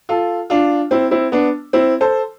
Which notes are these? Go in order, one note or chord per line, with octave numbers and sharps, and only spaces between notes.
F4 A4
D4 F4
C4 E4
C4 E4
B3 D4
C4 E4
A4 C5